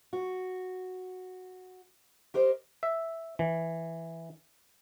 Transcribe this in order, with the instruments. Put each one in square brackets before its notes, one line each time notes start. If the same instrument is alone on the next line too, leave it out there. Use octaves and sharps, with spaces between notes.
[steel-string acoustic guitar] F#4
G4 A#4 C5 D#5
[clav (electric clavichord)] E5
E3